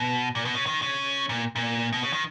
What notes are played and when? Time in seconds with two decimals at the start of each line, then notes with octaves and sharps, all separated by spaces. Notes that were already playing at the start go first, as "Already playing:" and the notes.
Already playing: B2
0.35 A#2
0.45 B2
0.55 C#3
0.66 D#3
0.82 C#3
1.29 A#2
1.56 A#2
1.93 B2
2.03 C#3
2.13 D#3